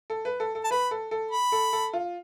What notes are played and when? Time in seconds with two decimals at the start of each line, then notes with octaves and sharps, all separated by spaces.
0.10 A4
0.25 B4
0.40 A4
0.55 A4
0.64 A5
0.71 B4 B5
0.91 A4
1.11 A4
1.31 B5
1.52 A4
1.73 A4
1.93 F4